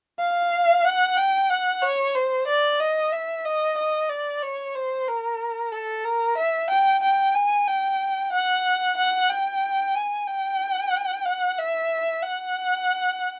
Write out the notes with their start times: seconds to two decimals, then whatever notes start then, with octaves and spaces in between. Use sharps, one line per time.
0.20 F5
0.85 F#5
1.17 G5
1.50 F#5
1.82 C#5
2.15 C5
2.47 D5
2.80 D#5
3.12 E5
3.45 D#5
3.78 D#5
4.10 D5
4.43 C#5
4.75 C5
5.08 A#4
5.72 A4
6.05 A#4
6.37 E5
6.70 G5
7.03 G5
7.35 G#5
7.68 G5
8.33 F#5
8.97 F#5
9.30 G5
9.95 G#5
10.28 G5
11.26 F#5
11.58 E5
12.23 F#5